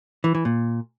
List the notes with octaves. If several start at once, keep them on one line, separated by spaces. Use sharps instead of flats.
E3
E3
A#2